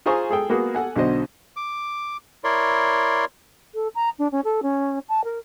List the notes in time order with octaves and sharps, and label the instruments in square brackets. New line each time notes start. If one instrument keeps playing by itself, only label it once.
[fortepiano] F4 G#4 C5 G#5 A#5 C#6
G#3 G#4 A4 G5
G#3 A#3 B3 F#4 G#4
A4 F#5 G#5
B1 D3 D4 F#4 C5 D#5
[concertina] D6
E4 A#4 C#5 D5 C6
[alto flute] A4
A#5
D4
C#4
A4
C#4
A5
A#4